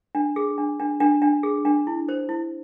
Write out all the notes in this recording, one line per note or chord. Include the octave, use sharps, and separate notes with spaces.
D4
G#4
D4
D4
D4
D4
G#4
D4
E4
C5
E4